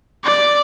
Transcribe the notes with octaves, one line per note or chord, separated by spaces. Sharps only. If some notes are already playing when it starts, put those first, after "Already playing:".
D5